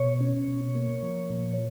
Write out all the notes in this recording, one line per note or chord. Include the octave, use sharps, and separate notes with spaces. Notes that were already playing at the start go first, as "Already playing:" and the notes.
Already playing: B2 C#5
C#4
B2
A#3
F3
A#2